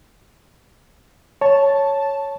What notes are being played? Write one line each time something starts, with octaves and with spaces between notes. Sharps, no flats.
C#5 A5